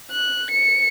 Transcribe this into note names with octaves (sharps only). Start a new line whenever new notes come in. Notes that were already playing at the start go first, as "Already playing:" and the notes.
F#6
C#7